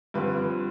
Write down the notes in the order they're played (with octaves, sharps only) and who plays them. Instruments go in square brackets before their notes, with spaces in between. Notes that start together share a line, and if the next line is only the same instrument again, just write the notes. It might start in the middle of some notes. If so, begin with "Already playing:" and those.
[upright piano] G2 D3 F3 C4 B4